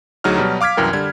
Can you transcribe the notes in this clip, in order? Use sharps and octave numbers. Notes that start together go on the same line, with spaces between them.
D2 F#3 D#4 G#4 D#5 F6
B2 F#3 G3
F5 D6 F6 G#6 B6
C2 F#2 E3 A#4 G5
D3 G3 G#6